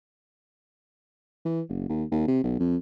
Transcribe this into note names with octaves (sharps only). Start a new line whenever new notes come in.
E3
F#1
D#2
D#2
C3
B1
F2